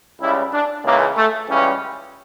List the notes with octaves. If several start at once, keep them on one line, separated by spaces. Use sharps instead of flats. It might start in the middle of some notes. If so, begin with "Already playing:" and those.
C#2 C#3 G3 E4
D4
C#2 C#3 E3 A#3
A3
C#2 C#3 E3 G3 C#4